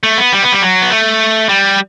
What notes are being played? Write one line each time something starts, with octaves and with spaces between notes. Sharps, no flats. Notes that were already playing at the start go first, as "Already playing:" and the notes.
A3
B3
G3
B3
G3
F#3
B3
A3
G3